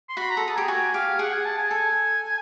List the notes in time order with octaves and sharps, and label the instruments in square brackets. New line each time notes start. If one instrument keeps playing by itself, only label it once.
[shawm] C6
[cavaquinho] F#4 [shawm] B5
[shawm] A#5
[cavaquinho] A4
[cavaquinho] G#4 [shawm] A5
[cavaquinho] G4 [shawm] G#5
[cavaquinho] F#4 [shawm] G#5
[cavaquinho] G4 [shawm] F5
[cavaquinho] G#4 [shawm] F#5
[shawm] G#5
A5
G#5
[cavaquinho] A4 [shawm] G#5